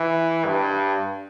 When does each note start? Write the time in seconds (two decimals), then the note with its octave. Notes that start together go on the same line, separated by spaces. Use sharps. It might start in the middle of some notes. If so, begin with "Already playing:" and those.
Already playing: E3
0.46 G2